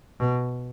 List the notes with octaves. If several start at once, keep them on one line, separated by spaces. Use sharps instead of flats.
B2